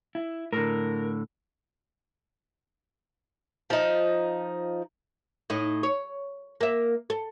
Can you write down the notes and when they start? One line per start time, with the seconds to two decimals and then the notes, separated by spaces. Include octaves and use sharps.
0.15 E4
0.53 A2 D3 A#4
3.70 F3 D#4
5.50 A2 D#4
5.83 C#5
6.61 A#3 E5
7.10 A4